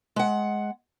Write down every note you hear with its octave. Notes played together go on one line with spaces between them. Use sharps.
G#3 F#5